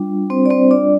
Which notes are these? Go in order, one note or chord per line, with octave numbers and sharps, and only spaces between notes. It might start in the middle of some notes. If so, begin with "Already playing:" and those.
Already playing: G3 D4 F4
C4 C5
D5
C4 C5
D4 D5